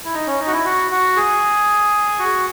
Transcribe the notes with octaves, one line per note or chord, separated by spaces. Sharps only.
E4
D#4
C#4
D#4
F#4
E4
F#4
F#4
G#4
F#4